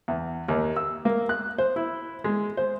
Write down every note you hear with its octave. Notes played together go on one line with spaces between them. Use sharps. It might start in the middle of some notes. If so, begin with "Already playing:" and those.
E2
D#2
E6
A#3
F#6
C5
E4
G#3
C5